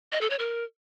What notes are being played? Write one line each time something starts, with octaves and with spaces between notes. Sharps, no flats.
D#5
A4
C#5
A#4